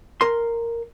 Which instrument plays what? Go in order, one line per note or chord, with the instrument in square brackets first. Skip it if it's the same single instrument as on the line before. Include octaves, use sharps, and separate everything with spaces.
[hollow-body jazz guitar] A#4 C6